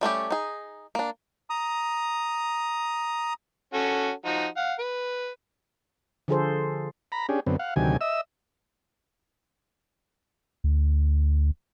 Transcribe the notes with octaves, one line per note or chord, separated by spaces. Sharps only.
G3 A3 C#4 G4
D#4 G#4
A#3 D4
A#5 D#6
C#4 F#4 A4
F3 D#4 F#4
F5 F#5
B4
D3 F3 F4 G#4 A4 C5
A#5 B5
C#4 D4 G4 G#4
F#2 D3 B3 C4
F5 F#5
D2 C3 D#3 F#3 G4 G#5
D#5 E5 E6
D2